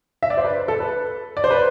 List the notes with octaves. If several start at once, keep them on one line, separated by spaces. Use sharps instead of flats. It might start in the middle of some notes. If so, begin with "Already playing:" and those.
E5
D5
C5
B4
A4
B4
D5
C5
B4